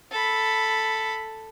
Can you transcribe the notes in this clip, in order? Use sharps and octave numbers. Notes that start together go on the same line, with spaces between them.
A4 B5